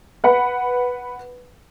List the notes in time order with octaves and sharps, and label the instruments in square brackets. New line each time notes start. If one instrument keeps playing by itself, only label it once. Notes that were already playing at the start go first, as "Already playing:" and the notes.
[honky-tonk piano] B4 F#5 B5